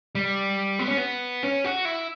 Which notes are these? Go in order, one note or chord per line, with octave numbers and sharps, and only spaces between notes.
G3
B3
C#4
B3
C#4
F#4
E4